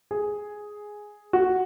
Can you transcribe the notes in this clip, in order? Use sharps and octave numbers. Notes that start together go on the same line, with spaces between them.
G#4
F#4